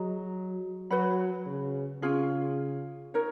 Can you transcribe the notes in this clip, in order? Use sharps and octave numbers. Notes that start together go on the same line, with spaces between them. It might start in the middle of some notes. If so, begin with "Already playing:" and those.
Already playing: F#3 G#4 D#5 A#5
F#3 B4 F#5 B5
C#3
C#3 C#4 F4 G#4
D#4 A#4 C#5